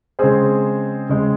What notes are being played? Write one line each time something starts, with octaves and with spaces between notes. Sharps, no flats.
C#3 G#3 C4 G#4 C5
C#3 G#3 C4